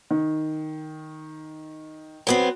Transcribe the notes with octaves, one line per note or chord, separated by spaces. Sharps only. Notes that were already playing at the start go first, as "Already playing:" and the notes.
D#3
F#3 B3 C4